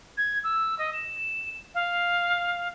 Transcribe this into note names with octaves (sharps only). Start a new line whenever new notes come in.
G#6
E6
D#5
E7
F5